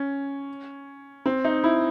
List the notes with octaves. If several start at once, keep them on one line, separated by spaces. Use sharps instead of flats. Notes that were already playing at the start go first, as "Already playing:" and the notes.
Already playing: C#4
C4
D#4
E4